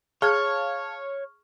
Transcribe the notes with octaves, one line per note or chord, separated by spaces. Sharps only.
G#4 C#5 F5 A5 C#6 F6 G#6